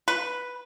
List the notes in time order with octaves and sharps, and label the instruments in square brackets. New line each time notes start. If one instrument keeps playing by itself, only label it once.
[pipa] B4